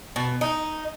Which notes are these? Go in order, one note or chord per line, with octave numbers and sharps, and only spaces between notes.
B2
D#4